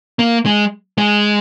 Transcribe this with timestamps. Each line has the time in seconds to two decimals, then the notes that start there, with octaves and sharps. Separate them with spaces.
0.19 A#3
0.46 G#3
0.98 G#3